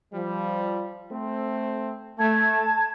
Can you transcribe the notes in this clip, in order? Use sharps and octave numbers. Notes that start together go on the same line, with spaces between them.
F3 G3
A3 C4
A3 A5 G#6